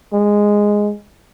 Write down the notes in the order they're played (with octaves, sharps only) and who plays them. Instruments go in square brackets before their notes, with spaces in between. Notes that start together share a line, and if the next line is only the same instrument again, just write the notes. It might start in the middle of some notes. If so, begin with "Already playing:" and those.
[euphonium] G#3